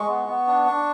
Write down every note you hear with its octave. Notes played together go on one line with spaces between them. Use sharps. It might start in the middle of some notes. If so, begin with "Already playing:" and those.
Already playing: G#3 C#6
B3
B3
D4
D4